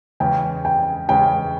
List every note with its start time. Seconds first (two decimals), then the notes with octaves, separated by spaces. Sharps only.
0.20 E2 C#3 G#3 C#4 G5
0.65 G5
1.09 E2 C#3 G#3 C#4 G5